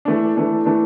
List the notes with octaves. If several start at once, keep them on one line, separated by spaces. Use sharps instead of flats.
E3 A3 D4
E3 A3 D4
E3 A3 D4